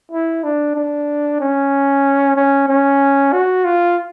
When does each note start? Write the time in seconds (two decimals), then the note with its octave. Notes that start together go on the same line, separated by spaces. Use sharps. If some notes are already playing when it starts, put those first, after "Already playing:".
0.11 E4
0.44 D4
0.76 D4
1.40 C#4
2.36 C#4
2.68 C#4
3.32 F#4
3.65 F4